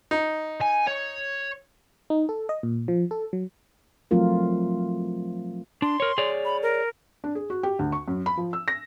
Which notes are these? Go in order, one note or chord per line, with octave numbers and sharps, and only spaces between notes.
D#4
G#5
C#5
D#4
A4
D#5
A#2
F3
A4
F#3
F3 F#3 A3 C4 F4 A#4
D4 C6
A#4 C#5
G#4 C#5 D5
B5
A#4
D4
G#4
F#4
G4
D2
C#6
F#2
B5
F3
E6
A#6